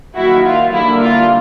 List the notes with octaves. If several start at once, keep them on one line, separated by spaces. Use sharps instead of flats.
D#3 F#3 A#3 E4 F#4
F4
D3 G3 A#3 D4 E4
F4